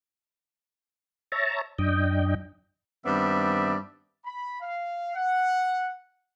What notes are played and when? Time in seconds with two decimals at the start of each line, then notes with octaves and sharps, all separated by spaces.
1.32 C#5 E5 A5 A#5
1.79 F#2 D4 D#5 G5
3.05 G2 D#3 B3 C4 D5 E5
4.25 B5
4.61 F5
5.16 F#5